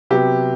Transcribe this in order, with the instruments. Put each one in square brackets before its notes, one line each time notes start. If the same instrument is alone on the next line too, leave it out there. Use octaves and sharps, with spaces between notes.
[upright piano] C3 F#3 B3 G4